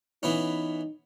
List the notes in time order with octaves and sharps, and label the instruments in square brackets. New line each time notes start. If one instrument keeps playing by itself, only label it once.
[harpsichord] E3 B3 C#4 [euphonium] D#4